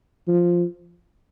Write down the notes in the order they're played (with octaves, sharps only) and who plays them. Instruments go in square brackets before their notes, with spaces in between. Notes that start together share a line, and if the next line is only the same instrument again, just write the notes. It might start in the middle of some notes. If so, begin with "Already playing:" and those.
[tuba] F3